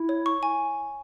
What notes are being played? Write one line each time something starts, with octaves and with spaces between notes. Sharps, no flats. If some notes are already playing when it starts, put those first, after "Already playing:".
Already playing: E4
C#5
C#6
G#5